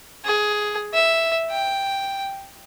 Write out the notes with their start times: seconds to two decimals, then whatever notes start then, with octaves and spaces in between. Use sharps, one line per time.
0.25 G#4
0.94 E5
1.50 G5